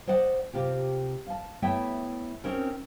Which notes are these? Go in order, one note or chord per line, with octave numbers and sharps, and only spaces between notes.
C5 D5 D#5 F#5
C3 F4 G4
F5 A5
A3 B3 E4 C#5 E5 G5
C4 C#4 D#4 F#4 A#4